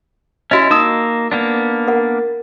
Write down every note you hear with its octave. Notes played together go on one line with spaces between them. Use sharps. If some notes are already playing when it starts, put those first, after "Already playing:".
C#4 E4 F#4 D#5
A#3 D#4 D#6 E6
A#3 B3 D4
A#4 F#5